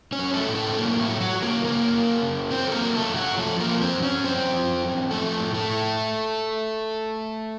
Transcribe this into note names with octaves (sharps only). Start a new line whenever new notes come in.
C#4 C#5
F#3
A3 A4
A2
A3 A4
C4
F#3 A#3
A3
F#3
F#3 F#4
F#3
A#3 A#4
C#3 A#3 A#4
F#2
C#3
F#3 C4 C5
A4
A#3 A#4
F#3
A3 A4
F#2
F#3 F#4
F3 A3 A4
A#3 A#4
F3
C4 C5
F#2
C#4 C#5
F#2 C4 C5
F3
F#2
F3 A3 A4
A2
A3 A4
A2